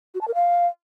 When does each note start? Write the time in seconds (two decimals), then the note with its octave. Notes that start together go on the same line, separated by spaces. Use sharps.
0.14 F#4
0.21 A5
0.28 A#4
0.34 F5